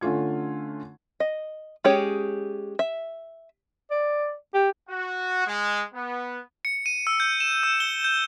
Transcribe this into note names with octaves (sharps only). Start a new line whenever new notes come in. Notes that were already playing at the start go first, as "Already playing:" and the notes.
D3 A3 C#4 F4 G#6
D#5
G#3 C#4 G4 G#4 C#5
E5
D5
G4
F#4
G#3
B3
C#7
D#7
E6
G6
E7
E6
G7
G6